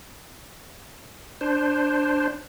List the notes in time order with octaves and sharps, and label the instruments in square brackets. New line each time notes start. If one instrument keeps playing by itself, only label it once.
[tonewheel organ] D4 C5